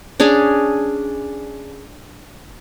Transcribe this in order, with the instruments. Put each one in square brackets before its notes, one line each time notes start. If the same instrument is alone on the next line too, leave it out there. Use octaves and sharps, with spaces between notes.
[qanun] C#4 D4 G#4